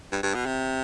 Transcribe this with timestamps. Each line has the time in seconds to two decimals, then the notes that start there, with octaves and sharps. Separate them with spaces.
0.12 G2
0.23 G2
0.35 B2
0.46 C3